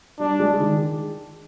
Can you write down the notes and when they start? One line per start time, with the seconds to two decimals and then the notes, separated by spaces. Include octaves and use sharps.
0.19 G3 D4
0.39 G#3
0.60 D#3